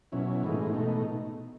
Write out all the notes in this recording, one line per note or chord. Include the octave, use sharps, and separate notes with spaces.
B2 F#3 C#4 E4
A2 E3 G#3 D#4
B2 A3 D#4